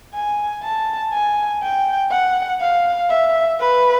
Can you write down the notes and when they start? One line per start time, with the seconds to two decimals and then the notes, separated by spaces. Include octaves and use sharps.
0.14 G#5
0.63 A5
1.12 G#5
1.62 G5
2.11 F#5
2.61 F5
3.10 E5
3.60 B4